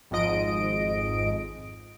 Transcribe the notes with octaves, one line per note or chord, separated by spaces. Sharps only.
G#1 F2 G#2 D#5 D7